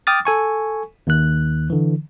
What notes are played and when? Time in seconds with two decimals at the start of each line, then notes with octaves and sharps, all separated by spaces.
0.07 G5 D6 D#6 F6 A6
0.25 A4 G#5 C#6
1.07 D#2 D#3 F#6
1.70 D3 E3